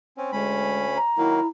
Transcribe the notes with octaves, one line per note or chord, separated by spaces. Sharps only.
C4 C#4
D2 G#3 C#4 B5
A#5
D#3 F#3 A#3 E4